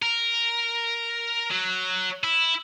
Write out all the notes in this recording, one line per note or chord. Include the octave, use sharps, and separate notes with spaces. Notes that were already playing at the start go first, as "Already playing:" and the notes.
A#4
F#3
E4